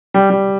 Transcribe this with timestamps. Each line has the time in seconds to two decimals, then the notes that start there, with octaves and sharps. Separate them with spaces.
0.14 G3
0.30 G3